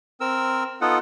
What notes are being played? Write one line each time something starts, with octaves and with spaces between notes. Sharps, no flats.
C4 A#4 E6
B3 D#4 F4 A4 F#5